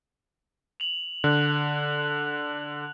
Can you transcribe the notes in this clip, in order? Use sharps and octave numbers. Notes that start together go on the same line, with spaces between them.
F7 F#7
D3 F#6